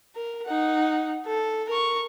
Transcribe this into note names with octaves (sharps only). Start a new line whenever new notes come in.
A#4
D#4 F#5
A4
A#4 C#6